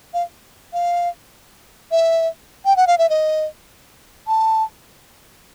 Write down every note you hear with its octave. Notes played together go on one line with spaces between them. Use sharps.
F5
F5
E5
G5
F#5
F5
E5
D#5
A5